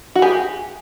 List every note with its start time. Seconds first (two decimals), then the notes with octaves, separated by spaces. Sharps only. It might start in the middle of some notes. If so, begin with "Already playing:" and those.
0.15 F#4
0.22 G4 G#4